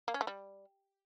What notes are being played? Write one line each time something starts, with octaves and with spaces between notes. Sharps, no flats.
A#3
C#4
A3
G3